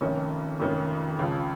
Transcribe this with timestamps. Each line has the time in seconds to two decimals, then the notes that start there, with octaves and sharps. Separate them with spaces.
0.01 F1 F2 D#3 C#4
0.60 F1 F2 D#3 C#4
1.19 C#2 C#3 F3